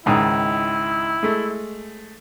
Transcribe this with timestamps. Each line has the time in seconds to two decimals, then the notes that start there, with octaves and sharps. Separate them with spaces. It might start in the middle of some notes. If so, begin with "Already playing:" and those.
0.06 C#2 G#2 D#3 E4
1.23 G#3 A3